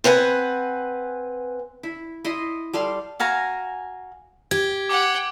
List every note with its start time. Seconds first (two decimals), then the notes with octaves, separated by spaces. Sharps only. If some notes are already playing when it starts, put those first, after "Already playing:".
0.04 C4 B4 F#5 G#5
1.83 E4
2.24 E4 D#5 C6
2.73 G3 A4 F5 C6
3.20 F#4 F5 G#5 A#5
4.51 G4 G#6
4.89 F#5 G5 D6